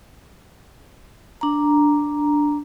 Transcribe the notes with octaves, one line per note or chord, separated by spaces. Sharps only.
D4 A#5